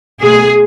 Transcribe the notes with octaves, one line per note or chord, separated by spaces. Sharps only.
B2 A3 G#4